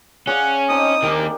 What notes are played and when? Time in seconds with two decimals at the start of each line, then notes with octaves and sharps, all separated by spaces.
0.27 C#4 G#4 D5 F5 F#5
0.69 C4 D4 D#4 D#6
1.03 D#3 A#3 G4 A#4